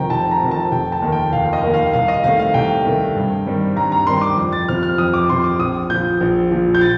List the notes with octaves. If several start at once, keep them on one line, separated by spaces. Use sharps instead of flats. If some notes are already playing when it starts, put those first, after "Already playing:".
Already playing: F1 F2 C3 D#3 G5 A#5
F1 A5
A#5
F2 C3 D#3
A5
F1 G5
A5
D#2 D#3 A#3
G5
F1 F5
D#5
D#2 D#3 A#3
F5
C2 F5
D#5
C3 D#3 A3 F5
F5
C2 G5
C3 D#3 A3
G2
D#3 G3 C4
G2 A#5
A#5
D#3 G3 C4 C6
D6
F2
A6
C3 F3 C4 F6
F6
F2 D#6
D6
C3 F3 C4 C6
D6
A#1 D#6
A#2 F3 G6
A#1
A#2 F3
G6
A6